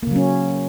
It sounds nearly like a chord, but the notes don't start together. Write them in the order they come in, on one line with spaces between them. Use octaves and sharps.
A#3 C#3 F#3 C#4